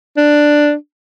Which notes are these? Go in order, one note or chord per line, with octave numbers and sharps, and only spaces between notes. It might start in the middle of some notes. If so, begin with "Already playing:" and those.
D4